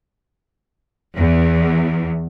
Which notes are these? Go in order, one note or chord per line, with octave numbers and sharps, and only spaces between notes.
E2